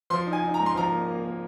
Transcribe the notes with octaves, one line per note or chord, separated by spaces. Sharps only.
F3 C6
D#4
G#5
D#4
A#5
G#2
C6
F3 A#5
A#3
A#3
A#3